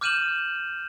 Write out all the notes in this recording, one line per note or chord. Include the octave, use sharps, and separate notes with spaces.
D6 F6 G6 D#7 E7 F#7